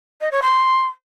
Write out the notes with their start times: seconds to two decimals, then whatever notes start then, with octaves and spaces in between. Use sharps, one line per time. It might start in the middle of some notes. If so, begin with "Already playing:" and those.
0.21 D#5
0.32 C#5
0.42 C6